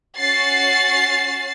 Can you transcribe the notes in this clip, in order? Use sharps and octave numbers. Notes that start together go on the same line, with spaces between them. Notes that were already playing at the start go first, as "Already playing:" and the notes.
C#4 F#4 A6 C7